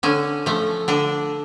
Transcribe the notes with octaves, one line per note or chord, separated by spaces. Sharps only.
D3 C#4
F3 A3
D3 D4